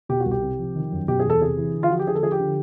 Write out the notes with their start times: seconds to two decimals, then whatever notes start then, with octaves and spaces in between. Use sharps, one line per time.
0.09 B2 G4
0.20 F#4
0.26 C2
0.31 G4
0.42 C3
0.59 F3
0.75 D#3
0.92 F#2
1.08 B2 G4
1.20 G#4
1.25 E2 A4
1.41 C3 G#4
1.58 E3
1.74 D3
1.83 F4
1.90 F3 F#4
1.99 G4
2.07 D3 G#4
2.15 A4
2.23 F3 G#4
2.32 G4
2.40 D3